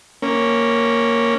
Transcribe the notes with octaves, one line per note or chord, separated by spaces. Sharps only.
A#3 C#4